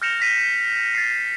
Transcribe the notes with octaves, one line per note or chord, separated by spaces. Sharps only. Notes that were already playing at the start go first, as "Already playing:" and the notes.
F6 G6 A#6 C#7 E7 F7
A#6 B6 D#7
A6 C7